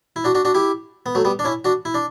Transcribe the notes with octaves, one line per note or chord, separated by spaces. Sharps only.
E4
D4 F#4
D4 F#4
D4 F#4
E4 G4
B3
F#3 A3
G3 B3
D4
C#4 E4
D4 F#4
E4
D4